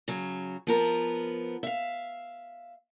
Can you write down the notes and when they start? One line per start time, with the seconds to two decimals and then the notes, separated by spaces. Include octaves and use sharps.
0.08 C#3 F#3
0.67 F3 B3 A#4
1.63 E5 F5